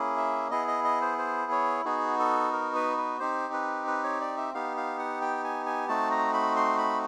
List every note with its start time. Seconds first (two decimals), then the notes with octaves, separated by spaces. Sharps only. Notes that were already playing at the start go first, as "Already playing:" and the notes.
Already playing: A#3 C#4 E4 G#4
0.17 E5
0.51 B3 E4 G#4 D#5
0.68 D#5
0.84 D#5
1.01 C5
1.18 C5
1.52 C#5
1.85 B3 D#4 F#4 G#4
2.19 A4
2.53 A#4
2.75 B4
2.97 B4
3.20 C4 D#4 G4 C5
3.53 B4
3.87 B4
4.04 C#5
4.21 D5
4.37 E5
4.54 B3 D#4 G4 F5
4.77 F5
4.99 F#5
5.22 G5
5.44 G#5
5.66 G#5
5.89 A3 C4 D#4 F#4 A5
6.11 A#5
6.33 B5
6.56 C6
6.78 B5